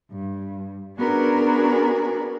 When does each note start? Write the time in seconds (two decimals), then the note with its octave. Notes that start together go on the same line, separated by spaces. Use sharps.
0.11 G2
0.99 B3 C#4 D4 F#4 G#4 A#4